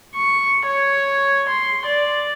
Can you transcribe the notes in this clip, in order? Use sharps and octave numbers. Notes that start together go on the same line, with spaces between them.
C#6
C#5
C6
D5